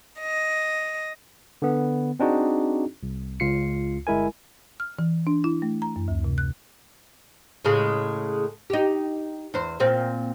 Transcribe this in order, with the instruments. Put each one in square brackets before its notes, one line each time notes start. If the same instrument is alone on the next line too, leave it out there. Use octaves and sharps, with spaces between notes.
[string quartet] D#5
[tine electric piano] D3 B3
C4 D4 D#4 F#4 G#4
C2
C#2 F4 C7 C#7
G1 G#3 E4 A#4 G#5
[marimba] F6
E3
D4
E4
A3
A#5
F#2
D2
C3
F#6
[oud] A2 C#3 G#3
D#4 G4
E2 C5
A#2 C4